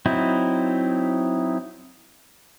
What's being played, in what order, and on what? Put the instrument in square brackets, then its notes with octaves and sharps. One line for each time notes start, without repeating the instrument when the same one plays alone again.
[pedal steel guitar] F#3 C4 D#4 E4